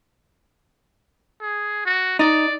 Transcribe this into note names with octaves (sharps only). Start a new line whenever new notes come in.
G#4
F#4
D#4 D5